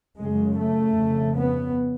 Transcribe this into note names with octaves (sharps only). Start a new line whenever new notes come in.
F#2 C#3 G#3
A3
F2 C#3
B3